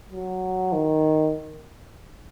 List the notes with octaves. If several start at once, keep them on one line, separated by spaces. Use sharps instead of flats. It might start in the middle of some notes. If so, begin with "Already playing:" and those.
F#3
D#3